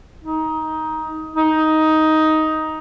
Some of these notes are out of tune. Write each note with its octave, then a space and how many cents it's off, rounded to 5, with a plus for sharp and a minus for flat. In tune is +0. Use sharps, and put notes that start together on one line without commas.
D#4 +15
D#4 +10